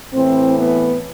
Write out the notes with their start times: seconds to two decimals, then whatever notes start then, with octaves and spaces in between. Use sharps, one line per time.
0.13 A2 E3 C4
0.57 B3